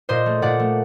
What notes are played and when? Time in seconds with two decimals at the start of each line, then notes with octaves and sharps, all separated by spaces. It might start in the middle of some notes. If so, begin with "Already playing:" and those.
0.09 A#2 C5 D#5
0.26 A3
0.42 A#2 D5 F#5
0.60 A3